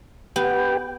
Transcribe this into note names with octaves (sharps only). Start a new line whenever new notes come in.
B3 G4 B4 G5